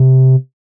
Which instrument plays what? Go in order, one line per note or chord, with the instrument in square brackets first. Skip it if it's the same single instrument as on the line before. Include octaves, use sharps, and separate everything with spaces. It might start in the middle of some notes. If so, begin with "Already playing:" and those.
Already playing: [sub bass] C3